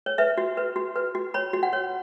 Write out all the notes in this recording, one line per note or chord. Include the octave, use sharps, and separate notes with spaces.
C#5
B4 E5
F#4
B4
F#4
B4
F#4
C#5 B5
F#4
F#5
C#5